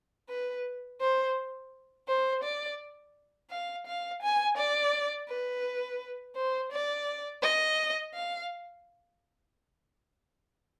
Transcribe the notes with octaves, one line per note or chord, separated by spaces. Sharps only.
B4
C5
C5
D5
F5
F5
G#5
D5
B4
C5
D5
D#5
F5